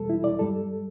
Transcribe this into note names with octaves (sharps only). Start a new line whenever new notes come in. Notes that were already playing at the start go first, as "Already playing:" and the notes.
Already playing: E2 B2 G3 A4
E4
D5
G2 G3 A4